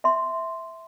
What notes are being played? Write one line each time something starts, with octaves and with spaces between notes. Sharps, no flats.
E5 C6